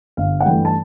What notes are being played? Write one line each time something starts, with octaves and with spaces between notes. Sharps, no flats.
G1 F5
F#5
G2 E3 A3 G5
A5